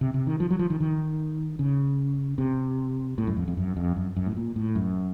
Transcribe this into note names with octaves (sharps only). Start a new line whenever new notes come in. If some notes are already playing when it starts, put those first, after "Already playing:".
C3
C3
D#3
F3
F#3
F3
D#3
D#3
C#3
C3
A2
F#2
F2
F2
F#2
F2
F#2
F#2
A2
A#2
A2
F#2